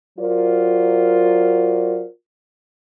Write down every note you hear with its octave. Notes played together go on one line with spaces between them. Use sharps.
F#3 F4 F#4 A#4 C5 D5